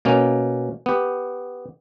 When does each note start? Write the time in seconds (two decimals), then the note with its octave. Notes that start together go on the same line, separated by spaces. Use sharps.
0.05 B2 A#3 C#4
0.86 B3 G4